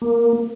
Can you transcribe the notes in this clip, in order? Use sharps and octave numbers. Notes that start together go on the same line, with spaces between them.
A#3